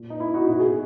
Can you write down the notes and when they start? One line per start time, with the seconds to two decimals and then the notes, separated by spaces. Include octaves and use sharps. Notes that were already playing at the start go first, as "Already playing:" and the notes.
Already playing: A#2
0.10 D#4
0.20 E4
0.34 D#4 F#4
0.48 B2 F#4
0.60 G#4